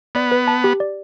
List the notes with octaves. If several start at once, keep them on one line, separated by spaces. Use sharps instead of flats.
B3 D5
B4
A5
G4
D5